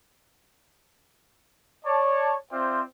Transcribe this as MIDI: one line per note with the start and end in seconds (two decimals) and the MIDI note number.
1.85 2.34 73
1.85 2.34 74
1.85 2.34 81
2.51 2.81 60
2.51 2.81 65
2.51 2.81 72
2.51 2.81 74
2.51 2.81 76
2.51 2.81 79